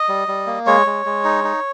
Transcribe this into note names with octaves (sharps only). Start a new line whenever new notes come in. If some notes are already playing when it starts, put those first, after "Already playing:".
Already playing: D#5
G3
G3
A#3
G#3 C#5
G#3
G#3
D#4
D#4